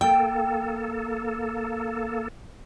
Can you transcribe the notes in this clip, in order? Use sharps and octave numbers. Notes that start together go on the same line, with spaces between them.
A#3 A4 G5